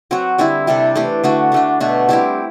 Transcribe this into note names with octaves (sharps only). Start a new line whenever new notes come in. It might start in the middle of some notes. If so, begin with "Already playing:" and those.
F#3 C4 F#4
D3 G3 C4 E4
C3 G3 D4 A4
E3 A3 D4 G4
D3 A3 D4 F#4
D3 A3 D4
B2 A3 D4 F#4
G3 C4 E4 G4